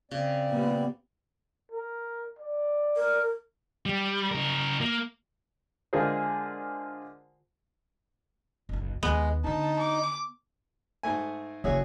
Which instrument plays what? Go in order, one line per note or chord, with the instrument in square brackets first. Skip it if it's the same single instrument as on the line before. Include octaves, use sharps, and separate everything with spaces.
[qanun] C#3 [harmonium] C4 D5
[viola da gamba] A#2 G3 [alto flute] B3
[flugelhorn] A#4
D5
[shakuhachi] A#4
[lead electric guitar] G3
C#3 A#4
A#3
[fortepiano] D3 G#3 F4 G#4 A#4 C5
[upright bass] F#1 B1
[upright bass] D#2 [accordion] G#3 [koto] B3
[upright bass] D3 D4 [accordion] D#4 [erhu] A5
[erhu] D6
[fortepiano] G#2 A3 G#5
[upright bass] F#1 [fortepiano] F#4 G#4 E5 [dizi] C#5